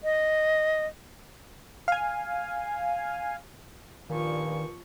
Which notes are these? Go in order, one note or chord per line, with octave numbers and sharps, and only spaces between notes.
D#5
F5 G#5
G2 A#2 D#3 F3 C#6